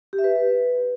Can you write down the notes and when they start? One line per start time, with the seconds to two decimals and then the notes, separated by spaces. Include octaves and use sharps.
0.13 G4
0.18 E5
0.24 B4